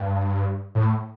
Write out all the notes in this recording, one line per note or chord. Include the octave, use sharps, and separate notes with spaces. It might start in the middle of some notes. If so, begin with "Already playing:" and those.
Already playing: G2
A2